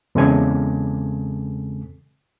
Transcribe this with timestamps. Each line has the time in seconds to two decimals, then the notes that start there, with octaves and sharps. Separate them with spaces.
0.15 E2 C#3 G#3 C4 A4 G#5